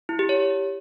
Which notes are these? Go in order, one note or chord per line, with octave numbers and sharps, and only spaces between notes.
E4
G4
C#5